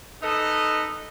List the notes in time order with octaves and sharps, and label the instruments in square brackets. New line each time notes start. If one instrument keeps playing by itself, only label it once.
[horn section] D#4 A4 B4 D#5